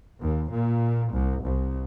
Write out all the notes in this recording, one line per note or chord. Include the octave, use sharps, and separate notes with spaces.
D#2
A#2
C2
C2